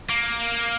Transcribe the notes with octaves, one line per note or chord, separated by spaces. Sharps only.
A#3